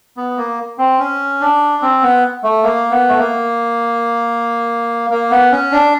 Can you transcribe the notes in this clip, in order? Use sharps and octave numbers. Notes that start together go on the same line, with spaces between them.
B3
A#3
C4
C#4
D4
C4
B3
A3
A#3
B3
A3
A#3
A#3
B3
C#4
D4